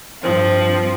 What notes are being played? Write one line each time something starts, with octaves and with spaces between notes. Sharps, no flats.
G2 F3 C4